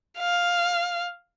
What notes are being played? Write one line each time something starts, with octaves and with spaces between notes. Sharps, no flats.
F5